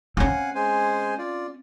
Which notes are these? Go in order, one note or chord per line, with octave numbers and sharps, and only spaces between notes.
C4 C#4 F5 F#5 G#5
G#3 C5 G#5
F4 D5